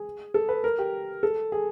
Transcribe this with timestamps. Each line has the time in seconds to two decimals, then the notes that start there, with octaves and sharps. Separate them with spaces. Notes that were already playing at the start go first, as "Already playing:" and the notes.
Already playing: G#4
0.34 A4
0.49 B4
0.64 A#4
0.78 G4
1.23 A4
1.52 G#4